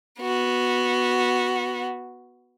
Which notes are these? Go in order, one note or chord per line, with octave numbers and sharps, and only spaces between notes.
B3 F#4